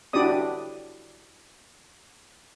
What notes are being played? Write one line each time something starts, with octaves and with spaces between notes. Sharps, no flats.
D4 E4 F#4 G4 D5 D#6